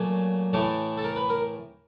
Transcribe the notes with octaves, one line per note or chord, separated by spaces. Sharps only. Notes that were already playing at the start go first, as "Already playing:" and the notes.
Already playing: A#2 F#3 A3 G#4
A2 E3 A3
A4
A#4
B4
A#4